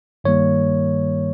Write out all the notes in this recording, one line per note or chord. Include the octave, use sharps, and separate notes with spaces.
G2 D#3 G3 A#3 C#5